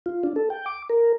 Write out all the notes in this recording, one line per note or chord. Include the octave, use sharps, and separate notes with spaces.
F4
D4
A4
G5
D6
A#4